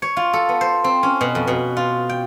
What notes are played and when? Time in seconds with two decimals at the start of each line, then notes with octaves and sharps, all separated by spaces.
0.02 C#5
0.17 F4
0.33 A4
0.49 B3
0.61 C5
0.84 C4
1.03 C#4
1.21 B2
1.35 F2
1.47 B2
1.77 F4
2.09 G5